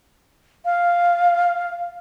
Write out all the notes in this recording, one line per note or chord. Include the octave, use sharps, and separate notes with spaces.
F5